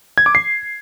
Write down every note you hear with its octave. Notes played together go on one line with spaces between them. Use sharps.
G#6
D6
C7